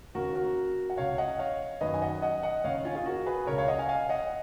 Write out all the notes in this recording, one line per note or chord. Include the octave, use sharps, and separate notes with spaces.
D#2 C#3 F#4 A#4
F#4 A#4
F#5
C#2 C#3 C#5 F5
D#5 F#5
C#5 F5
F#2 D#3 B4 D#5
G#5
D#5 F#5
D#5 F#5
D#5 F#5
D#2 C#3 C#5 F5
C#4 F4
F4 G#4
F#4 A#4
G#4 B4
C#2 C#3 A#4 C#5
C#5 F5
D#5 F#5
F5 G#5
F5 G#5
D#5 F#5